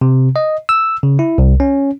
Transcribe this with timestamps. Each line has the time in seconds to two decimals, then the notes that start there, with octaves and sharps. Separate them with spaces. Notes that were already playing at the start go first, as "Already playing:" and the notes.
0.01 C3
0.36 D#5
0.69 E6
1.03 C#3
1.19 E4
1.38 C2
1.60 C#4